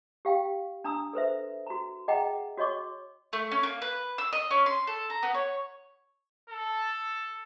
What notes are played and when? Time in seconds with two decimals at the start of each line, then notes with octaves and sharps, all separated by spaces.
0.25 G4 F5 G5
0.84 D4 A#5 D#6 E6
1.13 A4 B4 C5 E5
1.66 F#4 A#5
2.08 G#4 D#5 E5 F#5 G5 A#5
2.57 F#4 C#5 D#5 C#6 D6
3.33 A3
3.51 C#4
3.63 A#3
3.82 B4
4.18 E6
4.33 D#5
4.51 C#4
4.66 C6
4.87 A4
5.10 A#5
5.23 B3
5.34 C#5
6.50 A4